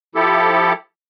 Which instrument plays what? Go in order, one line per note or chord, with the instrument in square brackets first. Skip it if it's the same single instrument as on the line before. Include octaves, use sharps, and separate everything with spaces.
[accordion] F3 E4 G4 A4